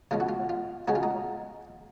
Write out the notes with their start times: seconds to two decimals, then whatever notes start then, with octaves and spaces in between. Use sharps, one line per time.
0.11 C#3 G#3 C#4 F4
0.20 F#4
0.29 F4
0.49 F4
0.88 C#3 G#3 C#4 F#4
0.95 F4
1.03 D#4